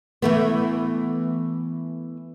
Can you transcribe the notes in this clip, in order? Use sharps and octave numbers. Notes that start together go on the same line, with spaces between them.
E3 A3 B3